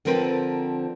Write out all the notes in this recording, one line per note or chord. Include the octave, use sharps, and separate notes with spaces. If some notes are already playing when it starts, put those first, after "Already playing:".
D3 F3 C4 A#4 B4